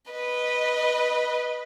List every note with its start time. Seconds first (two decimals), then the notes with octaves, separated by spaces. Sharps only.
0.12 B4 D#5